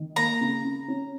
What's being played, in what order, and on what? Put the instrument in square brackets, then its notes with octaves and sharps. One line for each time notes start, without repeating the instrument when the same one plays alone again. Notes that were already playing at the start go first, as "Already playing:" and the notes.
Already playing: [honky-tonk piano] D#3
[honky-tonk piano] A#3 [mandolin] A#5
[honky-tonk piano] C#3
C#3
C#4